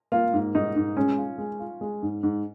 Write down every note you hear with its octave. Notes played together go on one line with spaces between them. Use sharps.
A#3 F4
G#2
G#2 D#4
G#2
G#3 C#4
F4
G#3
F4
G#3
G#2
G#2